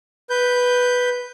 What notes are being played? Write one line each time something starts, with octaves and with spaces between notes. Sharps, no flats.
B4 G6